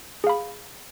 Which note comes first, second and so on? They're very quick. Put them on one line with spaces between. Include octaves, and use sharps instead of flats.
G#4 F5 B5